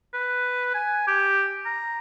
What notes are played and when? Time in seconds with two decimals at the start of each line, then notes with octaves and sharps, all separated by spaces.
0.14 B4
0.74 G#5
1.07 G4
1.66 A#5